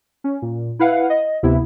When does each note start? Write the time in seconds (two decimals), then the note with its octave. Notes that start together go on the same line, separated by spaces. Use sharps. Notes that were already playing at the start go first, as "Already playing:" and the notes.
0.24 C#4
0.42 A#2
0.79 E4 B4 F5 F#5
1.10 D#5
1.43 D2 C3 B3 E4